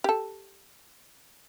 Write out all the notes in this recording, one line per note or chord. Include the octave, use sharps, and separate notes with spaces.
G4 A4